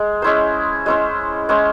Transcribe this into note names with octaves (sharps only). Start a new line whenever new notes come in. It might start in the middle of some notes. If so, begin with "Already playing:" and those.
Already playing: G#3
G#3 C#4 E4 C5
G#3 C#4 E4 C5
G#3 C#4 E4 C5